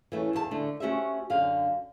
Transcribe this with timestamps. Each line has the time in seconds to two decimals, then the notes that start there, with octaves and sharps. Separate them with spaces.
0.12 E3 A3 C#4
0.33 E2 D#3 B4 A5
0.51 D3 A3
0.80 A3 C#4 F#4 G4 C5 E5
1.30 F#2 D3 F5